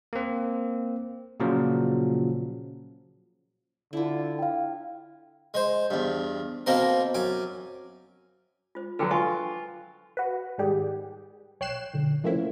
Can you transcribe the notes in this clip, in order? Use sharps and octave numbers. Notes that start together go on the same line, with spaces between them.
A#3 C4
A#2 C#3 F3 F#3
D3 E4 F4
F5 G5
G#3 C5
E2 G2
B2 A#3 C4 A4 A#4
F#2 G#5 D6
F4 C5
D3 F#3 B4 G5 B5
F4 G#5 C#6 D#6
F#4 B4
G#2 D#3 G3 G4 G#4
B1 C#5 G5 F#6 C7 E7
B1 D3
F3 A3 A#3 C4 C#4 E4